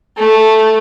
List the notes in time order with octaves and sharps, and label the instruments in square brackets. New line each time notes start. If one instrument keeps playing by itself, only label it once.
[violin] A3